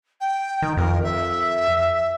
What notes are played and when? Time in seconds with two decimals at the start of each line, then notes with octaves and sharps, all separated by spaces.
0.21 G5
0.62 D#3
0.77 F2 A#4
1.03 E5